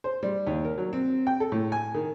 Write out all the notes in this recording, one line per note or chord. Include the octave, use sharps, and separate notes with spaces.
C5
G3
D#2
A#4
F#3
C4
G5
A4
A2
G#5
D#3